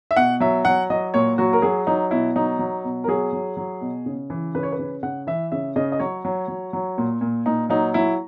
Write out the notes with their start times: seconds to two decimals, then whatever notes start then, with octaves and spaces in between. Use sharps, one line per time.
0.11 E5
0.17 B2 F#5
0.40 F#3 E5
0.65 F#3 F#5
0.90 F#3 D#5
1.14 A#2 C#5
1.38 F#3 F#4
1.53 A#4
1.62 F#3 G#4
1.87 F#3 D#4
2.11 B2 E4
2.36 F#3 D#4
2.59 F#3
2.84 B2
3.04 A#4
3.08 F#3 G#4
3.33 F#3
3.57 F#3
3.81 B2
4.06 C#3
4.30 E3
4.55 C#3 B4
4.63 C#5
4.72 B4
4.79 C#3
5.03 C#3 F#5
5.27 E3 E5
5.52 C#3 E5
5.76 C#3 D#5
5.92 D#5
5.99 F#3 C#5
6.25 F#3
6.48 F#3
6.73 F#3
6.98 A#2
7.21 A#2
7.46 A#2 D#4
7.70 F#3 D#4
7.94 F#3 E4